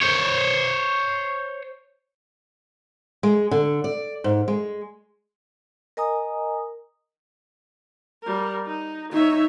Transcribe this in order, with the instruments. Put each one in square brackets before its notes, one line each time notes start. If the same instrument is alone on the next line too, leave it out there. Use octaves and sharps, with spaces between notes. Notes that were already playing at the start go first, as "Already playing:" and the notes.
[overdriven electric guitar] C5 C#5
[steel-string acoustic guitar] G#3
D3
D5
G#2
G#3
[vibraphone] A#4 D#5 G#5 A#5 D#6
[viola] G3 A#4
D#4
[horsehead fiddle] D#4 [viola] C#5 E5